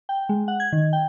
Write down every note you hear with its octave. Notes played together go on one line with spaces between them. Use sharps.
G5
G#3
F#5
G#6
D#3
G5